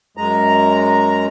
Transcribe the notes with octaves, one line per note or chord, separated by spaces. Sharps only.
F#2 G#3 A#5